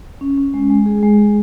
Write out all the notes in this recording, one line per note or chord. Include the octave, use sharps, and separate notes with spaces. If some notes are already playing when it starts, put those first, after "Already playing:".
C#4
C#4
G#3
G#3
G#4
G#3
G#4